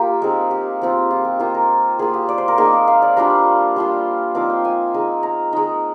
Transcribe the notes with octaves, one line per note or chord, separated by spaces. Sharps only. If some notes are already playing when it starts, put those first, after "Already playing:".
Already playing: A#3 F4 G4
G#3 C4 D#4
G4
F3 C4 F4
F4
G4
A#3 F4 G4
A#4
A#3 F4 G#4
G4
D5
C5
A#4
A#3 D#4 G#4
A#4
F5
D5
G3 D4 F4 A#5
G3 D4 F4 C6
F3 C4 D#4 D6
G5
G#5
G#3 D#4
A#5
G#3 D#4